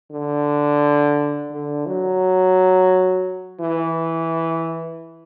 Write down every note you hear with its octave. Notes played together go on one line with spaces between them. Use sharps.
D3
D3
F#3
E3